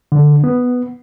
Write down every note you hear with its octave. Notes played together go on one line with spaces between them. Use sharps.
D3
B3